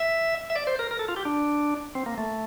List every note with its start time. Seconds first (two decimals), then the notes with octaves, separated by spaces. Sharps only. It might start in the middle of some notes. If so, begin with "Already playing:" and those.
Already playing: E5
0.50 E5
0.56 D5
0.67 C5
0.79 A#4
0.91 A#4
0.99 A4
1.08 F4
1.16 G4
1.25 D4
1.95 C4
2.06 A#3
2.18 A3